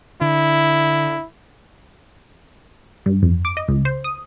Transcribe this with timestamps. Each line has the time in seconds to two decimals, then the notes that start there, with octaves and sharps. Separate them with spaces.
0.21 D3 E4
3.06 G2
3.22 F2
3.45 D6
3.57 D#5
3.68 C#2
3.85 C5
4.04 D#6